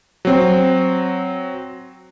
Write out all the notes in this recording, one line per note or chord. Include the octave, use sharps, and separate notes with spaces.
F#3 C4